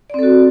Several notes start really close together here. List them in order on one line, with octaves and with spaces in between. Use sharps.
D5 C4 A4 F#4